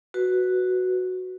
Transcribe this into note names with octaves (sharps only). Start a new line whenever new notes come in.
F#4 B4